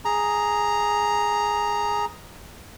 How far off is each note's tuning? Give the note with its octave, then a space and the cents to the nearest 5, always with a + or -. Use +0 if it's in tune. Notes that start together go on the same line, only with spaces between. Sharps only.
G#4 +0 A#5 +0